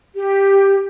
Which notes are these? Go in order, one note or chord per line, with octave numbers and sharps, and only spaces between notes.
G4